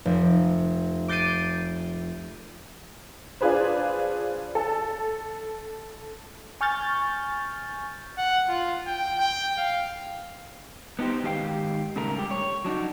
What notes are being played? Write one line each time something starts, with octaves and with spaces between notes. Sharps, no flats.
F1
D6 G6 A6 C7 D7 D#7
D4 F4 G#4 B4 C5
A4
G#5 C#6 F6 G6 A6
F#5
F4
G5
G5
F5
B3 D4 D#4 G4 C5
G#2 D#3 G4 G#4 F5 G5
A#2 C#3 G#3 A3 A#4
G2 G4
C#5
F#3 D4 D#4 F#4